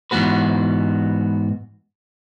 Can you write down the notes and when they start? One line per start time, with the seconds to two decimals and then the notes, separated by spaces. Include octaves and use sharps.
0.11 G#2 E3 B3 F#4 B4